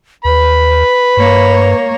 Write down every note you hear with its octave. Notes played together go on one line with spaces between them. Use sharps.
D#2 B4 B5
G2 A#3 C#5